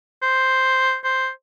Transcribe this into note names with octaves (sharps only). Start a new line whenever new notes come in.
C5
C5